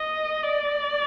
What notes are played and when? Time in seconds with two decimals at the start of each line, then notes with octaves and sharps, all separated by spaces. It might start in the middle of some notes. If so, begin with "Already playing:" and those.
Already playing: D#5
0.43 D5